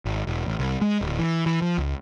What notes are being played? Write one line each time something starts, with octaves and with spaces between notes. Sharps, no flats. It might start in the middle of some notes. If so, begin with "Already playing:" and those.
G#1
E1
A1
C2
G#3
D1
E3
E3
F3
C#2